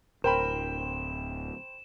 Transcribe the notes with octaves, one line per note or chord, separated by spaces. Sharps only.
D1 A#4 C5 G5 B5 E7